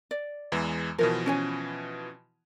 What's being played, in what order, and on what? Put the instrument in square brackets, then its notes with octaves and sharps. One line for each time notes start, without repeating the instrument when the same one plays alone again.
[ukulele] D5
[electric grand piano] E2 E3 G#3
[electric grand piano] B2 E3 F3 [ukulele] A#4
[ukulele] C#4 C#5 G#5